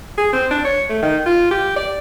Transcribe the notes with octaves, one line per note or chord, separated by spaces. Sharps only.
G#4
C4
D4
C#5
A3
D#3
F4
G4
D5